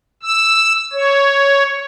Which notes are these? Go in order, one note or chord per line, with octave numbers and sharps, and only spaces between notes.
E6
C#5